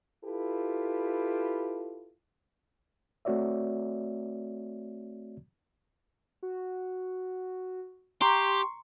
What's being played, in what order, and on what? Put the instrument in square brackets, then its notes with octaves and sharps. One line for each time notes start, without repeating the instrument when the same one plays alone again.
[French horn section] E4 F4 G4 A4 B4
[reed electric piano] A3 C4 F#4 C#5 D5 E5
[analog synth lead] F#4
[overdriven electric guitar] G4 [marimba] A#5 [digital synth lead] C6 [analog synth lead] C#6